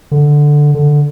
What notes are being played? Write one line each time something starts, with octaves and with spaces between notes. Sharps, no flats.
D3
D3